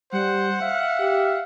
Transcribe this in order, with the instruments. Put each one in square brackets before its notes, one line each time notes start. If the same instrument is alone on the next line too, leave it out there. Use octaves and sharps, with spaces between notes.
[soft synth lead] G3 [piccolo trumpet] C5 [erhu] F#5
[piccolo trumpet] E5 [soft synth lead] F5
[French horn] G4